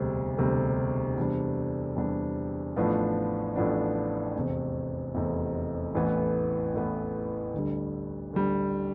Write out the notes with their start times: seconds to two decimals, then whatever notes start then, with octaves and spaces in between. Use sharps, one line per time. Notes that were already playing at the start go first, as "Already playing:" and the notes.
Already playing: E1 D2 C3 G3
0.37 E1 D2 C3 G3
1.16 E2 C3 G3 D4
1.96 E2 C3 G3 D4
2.76 A1 A2 F3 B3 D4
3.56 A1 A2 F3 B3 D4
4.35 F1 E2 C3
5.15 F1 E2 C3
5.95 A1 A2 E3 B3
6.74 A1 A2 E3 B3
7.54 D2 D3 G3
8.33 D2 D3 G3